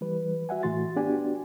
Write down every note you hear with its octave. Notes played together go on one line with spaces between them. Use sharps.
E3 G3 B4
F#4 E5 F#5 G#5
A2 E3 A3 F#4 C6 A6
B3 D4 F#4 G4 D5 G#5